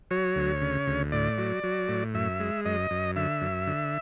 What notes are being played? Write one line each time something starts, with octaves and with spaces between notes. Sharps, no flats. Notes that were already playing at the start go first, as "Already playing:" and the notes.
F#3 C#5
D2
C#3
D2
A2 D5
F#3
F#3
A2
F#2 E5
G#3
F#2 D#5
F#2
D3 E5
F#2
D3